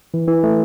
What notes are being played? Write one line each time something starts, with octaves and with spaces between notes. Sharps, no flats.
E3
E3
A3